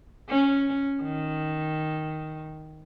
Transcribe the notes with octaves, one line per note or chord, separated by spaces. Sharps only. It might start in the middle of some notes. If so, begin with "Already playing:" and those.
C#4
D#3